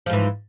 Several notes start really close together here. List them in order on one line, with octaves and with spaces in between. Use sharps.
F3 G#2 E3